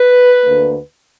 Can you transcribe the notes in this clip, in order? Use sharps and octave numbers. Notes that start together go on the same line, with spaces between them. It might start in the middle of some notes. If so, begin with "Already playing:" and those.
Already playing: B4
D2 D3 A#3